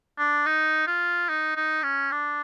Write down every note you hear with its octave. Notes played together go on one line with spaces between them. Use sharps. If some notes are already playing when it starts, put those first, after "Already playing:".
D4
D#4
F4
D#4
D#4
C#4
D4